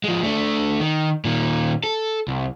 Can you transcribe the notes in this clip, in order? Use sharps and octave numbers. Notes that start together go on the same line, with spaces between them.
F3 G#3
A3 D4
D#3
A#2 D#3
A4
C2